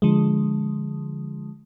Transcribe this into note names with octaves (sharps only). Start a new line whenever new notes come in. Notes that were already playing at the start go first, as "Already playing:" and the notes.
D3 F3 G#3